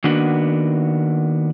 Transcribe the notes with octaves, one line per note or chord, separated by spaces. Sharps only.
D#3 A#3 B3 D4 F#4